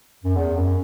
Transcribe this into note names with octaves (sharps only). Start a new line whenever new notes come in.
F#2
E2
F#2